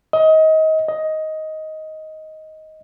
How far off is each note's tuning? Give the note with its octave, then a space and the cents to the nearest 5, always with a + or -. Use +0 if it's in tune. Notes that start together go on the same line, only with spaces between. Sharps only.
D#5 +25
D#5 +10